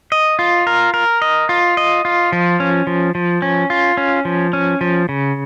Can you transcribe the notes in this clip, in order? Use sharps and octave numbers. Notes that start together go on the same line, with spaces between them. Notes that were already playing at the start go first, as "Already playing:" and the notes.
D#5
F4
A#4
A#4
D#5
F4
D#5
F4
F3
C#4
F3
F3
C#4
F4
C#4
F3
C#4
F3
C#3